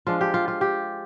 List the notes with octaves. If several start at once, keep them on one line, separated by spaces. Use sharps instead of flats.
F3 G#3 D4 F4
G4
F4
F4
G4